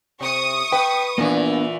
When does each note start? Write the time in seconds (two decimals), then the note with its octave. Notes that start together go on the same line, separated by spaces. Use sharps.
0.21 C3 C#6 D#6
0.72 B4 G5
1.18 A#2 E3 A#3 B3 D4